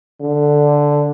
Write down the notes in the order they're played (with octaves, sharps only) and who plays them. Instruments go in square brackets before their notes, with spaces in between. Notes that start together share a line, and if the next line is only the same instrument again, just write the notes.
[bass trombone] D3